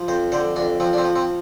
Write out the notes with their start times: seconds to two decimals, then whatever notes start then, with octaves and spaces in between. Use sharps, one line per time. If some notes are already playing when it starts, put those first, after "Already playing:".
Already playing: F3
0.08 F2 C5
0.32 D3 C5
0.56 F2 D4
0.80 F3 C4
0.93 D4
0.98 C4
1.04 F3
1.16 C4